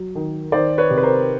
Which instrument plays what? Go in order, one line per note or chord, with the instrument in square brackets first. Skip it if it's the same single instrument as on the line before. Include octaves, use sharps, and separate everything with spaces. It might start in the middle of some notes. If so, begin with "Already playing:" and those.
Already playing: [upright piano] F#3
D#3
D#3 C5 D5
B4 C#5
C3
B4
A#4 C5